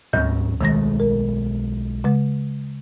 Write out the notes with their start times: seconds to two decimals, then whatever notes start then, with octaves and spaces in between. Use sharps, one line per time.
0.13 D2 G#2 F#3 C#4 G6
0.61 B1 D#3 G#3 A3 A#6
1.00 A#4
2.04 C#3 G#3